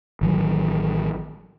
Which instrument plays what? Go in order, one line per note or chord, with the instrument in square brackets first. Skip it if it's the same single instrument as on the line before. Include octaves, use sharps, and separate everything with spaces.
[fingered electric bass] A1 D#3 F#3